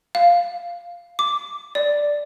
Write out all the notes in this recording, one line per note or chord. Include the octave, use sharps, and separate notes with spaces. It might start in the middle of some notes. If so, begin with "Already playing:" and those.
F5
D6
D5